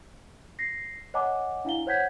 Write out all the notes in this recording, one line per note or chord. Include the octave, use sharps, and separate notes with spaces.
A#6 C7
C#5 D#5 F#5 G#5 A#5 D6
D4 E4 F5 G7
C5 C#5 F#5 G6 G#6 B6